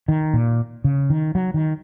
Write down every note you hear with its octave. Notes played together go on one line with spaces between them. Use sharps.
D#3
A#2
C#3
D#3
F#3
D#3